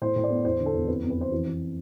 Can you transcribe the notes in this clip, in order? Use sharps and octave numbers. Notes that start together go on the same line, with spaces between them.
A2 C5
A2
D5
B3
E2 C5
D3
A4
E2
F2 B4
F2
B4
F2 C5
E3
E3